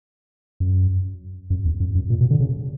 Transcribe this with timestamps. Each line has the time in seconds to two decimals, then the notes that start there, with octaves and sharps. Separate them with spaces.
0.60 F#2
1.50 F#2
1.65 E2
1.80 F#2
1.95 F#2
2.10 A#2
2.21 B2
2.31 D3
2.40 C#3